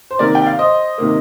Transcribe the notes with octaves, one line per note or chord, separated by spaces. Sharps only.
C5
C3 D#3 A#3 A#4 D5
G5
F5
C5 D#5
C3 D#3 A#3